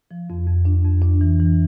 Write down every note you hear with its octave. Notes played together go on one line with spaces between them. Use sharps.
F3
F2
F2
D4
F2
D4
E3
E3